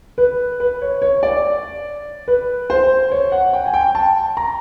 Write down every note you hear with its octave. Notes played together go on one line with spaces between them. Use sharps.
B4
B4
C#5
C#5
D5
B4
C5
C#5
F#5
G5
G#5
G5
A5
A#5